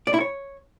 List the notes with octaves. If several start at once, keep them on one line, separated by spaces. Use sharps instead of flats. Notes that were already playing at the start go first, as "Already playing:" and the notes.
D5
E4
C#5